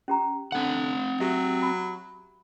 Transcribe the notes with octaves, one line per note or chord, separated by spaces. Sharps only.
C#4 G4 A#5
D3 C4 F#5
F#3 G4 E5
B5